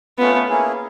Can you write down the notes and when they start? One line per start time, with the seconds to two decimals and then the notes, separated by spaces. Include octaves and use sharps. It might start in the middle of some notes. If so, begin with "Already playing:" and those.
0.18 A3 B3 C#4 F4
0.49 A#3 C#4 E4 G#4